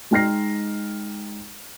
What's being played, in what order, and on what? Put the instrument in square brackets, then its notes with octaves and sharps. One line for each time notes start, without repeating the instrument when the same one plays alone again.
[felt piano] G#3 D#4 G5 F6 A#6 C7